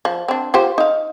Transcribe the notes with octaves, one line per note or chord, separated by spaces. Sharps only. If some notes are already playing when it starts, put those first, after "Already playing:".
F3
C4 D4
F4 G4 C5
D#4 F5